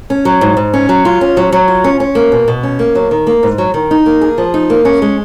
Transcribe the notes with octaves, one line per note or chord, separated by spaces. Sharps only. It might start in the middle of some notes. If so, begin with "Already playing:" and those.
C#4
F#3
G#2
G#2
C#4
F#3
F4
C#4
F#3
F#3
F4
C#4
C#4
A#3
B2
B2
C#4
A#3
F#3
D#3
A#3
G#2
F#3
D#3
D#4
A#3
G#4
F3
D#4
A#3
C#4
G#3